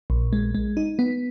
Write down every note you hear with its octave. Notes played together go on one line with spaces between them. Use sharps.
A#1
G#3
G#3
D#4
B3